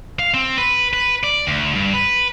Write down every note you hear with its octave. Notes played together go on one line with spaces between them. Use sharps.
F5
C4
B4
B4
D5
D2
G2
B4